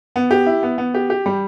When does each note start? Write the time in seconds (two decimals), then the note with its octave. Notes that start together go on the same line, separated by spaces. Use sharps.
0.16 B3
0.31 G4
0.47 E4
0.63 B3
0.78 B3
0.94 G4
1.10 G4
1.26 G3